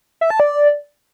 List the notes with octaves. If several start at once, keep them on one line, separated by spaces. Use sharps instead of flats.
E5
A5
D5